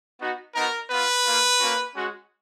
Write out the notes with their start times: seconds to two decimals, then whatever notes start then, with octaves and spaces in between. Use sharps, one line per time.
0.19 B3 D#4 F#4
0.55 B3 D#4 F#4 A#4
0.89 B3 F4 B4
1.25 A#3 F4
1.60 A#3 C#4 F#4
1.95 G#3 C#4 F#4